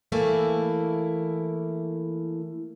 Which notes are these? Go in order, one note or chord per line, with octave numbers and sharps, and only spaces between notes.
E3 A3 A#3 E4